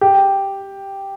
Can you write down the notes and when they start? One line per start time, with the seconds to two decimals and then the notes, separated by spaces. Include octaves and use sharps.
0.01 G4